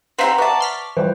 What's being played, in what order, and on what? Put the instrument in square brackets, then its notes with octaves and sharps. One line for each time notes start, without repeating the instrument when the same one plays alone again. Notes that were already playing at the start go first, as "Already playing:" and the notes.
[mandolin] C4 E4 G4 [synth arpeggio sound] B4 C5 F5 [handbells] F#5 A#5
[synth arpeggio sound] B4 E5 [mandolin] D5 A5 [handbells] C#6 D6
[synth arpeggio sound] C6 F6 B6
[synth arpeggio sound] E3 F3 G3 [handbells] B4 C5